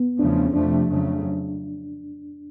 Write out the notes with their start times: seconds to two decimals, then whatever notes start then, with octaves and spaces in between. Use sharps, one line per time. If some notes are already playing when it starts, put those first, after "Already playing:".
Already playing: B3
0.19 E2 C#3 F3 A3 D4
0.46 C#4
0.53 F2 C3 F3 A3 D4
0.87 F2 C#3 F#3 A3